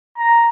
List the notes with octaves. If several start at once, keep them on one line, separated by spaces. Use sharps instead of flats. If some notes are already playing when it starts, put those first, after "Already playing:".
A#5